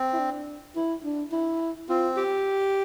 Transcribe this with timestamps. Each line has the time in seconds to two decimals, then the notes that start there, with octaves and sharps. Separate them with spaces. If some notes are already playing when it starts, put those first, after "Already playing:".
Already playing: C4
0.13 E4
0.19 D4
0.76 E4
1.04 D4
1.32 E4
1.89 C4 F4
2.17 G4